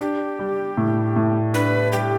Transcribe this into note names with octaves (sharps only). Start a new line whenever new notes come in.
D4 G4
G3
A2
A2
D4 B4
G3 G4